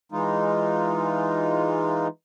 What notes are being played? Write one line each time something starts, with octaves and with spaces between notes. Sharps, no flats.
E3 G#3 D#4 F4